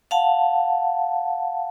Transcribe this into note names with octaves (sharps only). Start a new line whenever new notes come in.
F5 F#5 A5